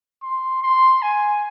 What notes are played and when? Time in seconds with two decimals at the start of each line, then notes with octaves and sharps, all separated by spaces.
0.22 C6
0.62 C6
1.02 G#5